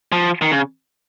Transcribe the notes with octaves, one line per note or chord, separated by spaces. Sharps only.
F3
D#3
C#3